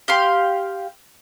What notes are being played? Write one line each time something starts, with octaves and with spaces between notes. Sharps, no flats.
G4 F5 C6